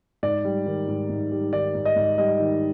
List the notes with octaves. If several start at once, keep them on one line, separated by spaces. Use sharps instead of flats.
G#2 D5
G3
D#3
G#2
G#2
G3
D#3 D5
G#2
D#5
G#2
G3 D#5
D#3